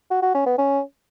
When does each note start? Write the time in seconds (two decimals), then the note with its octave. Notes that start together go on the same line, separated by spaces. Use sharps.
0.11 F#4
0.23 F#4
0.35 C#4
0.46 B3
0.58 C#4